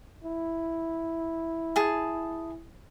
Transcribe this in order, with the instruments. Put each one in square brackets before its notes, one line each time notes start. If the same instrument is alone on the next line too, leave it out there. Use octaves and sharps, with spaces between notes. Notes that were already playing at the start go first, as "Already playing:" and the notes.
[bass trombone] E4
[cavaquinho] G#4 A5